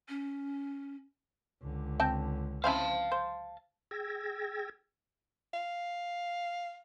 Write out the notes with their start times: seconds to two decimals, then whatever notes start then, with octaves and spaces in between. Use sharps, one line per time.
0.09 C#4
1.61 C#2 D3
2.00 C4 G5 A5
2.64 C4 C#4 E4 F5 A5
3.12 C5
3.91 G#4 G5 E6 G#6 A#6
5.54 F5